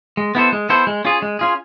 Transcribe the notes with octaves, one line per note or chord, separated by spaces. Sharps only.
G#3
B3 E4 A4 C5
G#3
B3 E4 A4 C5
G#3
C#4 F4 G#4
G#3
C#4 F4 G#4